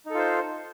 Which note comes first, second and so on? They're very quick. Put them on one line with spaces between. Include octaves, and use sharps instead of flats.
D#4 A4 F4 C5